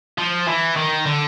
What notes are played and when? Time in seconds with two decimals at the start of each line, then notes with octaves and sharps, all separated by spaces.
0.18 F3
0.48 E3
0.76 D#3
1.07 D3